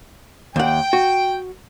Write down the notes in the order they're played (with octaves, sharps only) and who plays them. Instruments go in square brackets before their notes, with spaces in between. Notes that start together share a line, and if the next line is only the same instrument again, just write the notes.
[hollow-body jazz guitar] D#2 F#5 [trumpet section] G5
[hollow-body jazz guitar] F#4